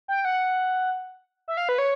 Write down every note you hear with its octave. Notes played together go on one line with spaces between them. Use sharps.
G5
F#5
E5
F5
B4
C#5